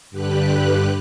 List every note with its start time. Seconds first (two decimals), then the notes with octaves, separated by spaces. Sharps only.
0.11 G2 D3 G4 B4 F#6